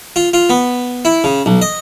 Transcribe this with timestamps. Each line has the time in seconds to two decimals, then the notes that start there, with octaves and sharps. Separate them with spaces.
0.16 F4
0.33 F4
0.50 B3
1.05 E4
1.24 C#3
1.46 B1
1.62 D#5